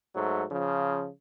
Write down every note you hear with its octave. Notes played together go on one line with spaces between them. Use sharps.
G#2 F#3 A3
C#3 F3